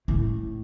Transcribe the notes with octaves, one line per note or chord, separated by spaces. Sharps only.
A2